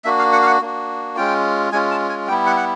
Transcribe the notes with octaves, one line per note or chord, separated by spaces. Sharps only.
A#3 D4 F#4 E5
F5
F#5
F5
F#5
A#3 D4 F#4
G#3 C#4 F4 G5
G#3 C#4 F4 G#5
A5
G#5
G3 B3 E4 G5
F#5
F#5